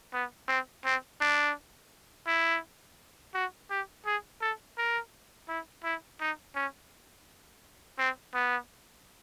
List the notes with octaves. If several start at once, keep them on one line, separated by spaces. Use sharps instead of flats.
B3
C4
C4
D4
E4
F#4
G4
G#4
A4
A#4
E4
E4
D#4
C#4
C4
B3